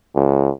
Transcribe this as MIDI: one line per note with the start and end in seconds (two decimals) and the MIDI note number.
0.15 0.50 37